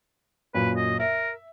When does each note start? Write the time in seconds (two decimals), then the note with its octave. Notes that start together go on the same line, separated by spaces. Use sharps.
0.55 F#2 A#2 B4
0.76 D#5
1.00 A#4 E5